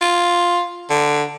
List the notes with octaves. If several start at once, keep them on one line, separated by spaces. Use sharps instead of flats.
F4
D3